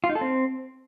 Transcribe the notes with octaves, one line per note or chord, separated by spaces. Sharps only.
F4
D#4
A4
C4